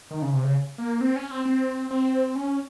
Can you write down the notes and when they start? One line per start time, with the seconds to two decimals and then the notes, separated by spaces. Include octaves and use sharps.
0.11 D#3
0.22 C#3
0.33 C3
0.44 C#3
0.78 A#3
1.01 C4
1.16 C#4
1.31 C4
1.45 C4
1.90 C4
2.36 C#4